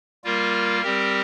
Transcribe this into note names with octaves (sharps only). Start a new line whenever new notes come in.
G3 A#3 F4 A#4
G3 C4 G4 A#4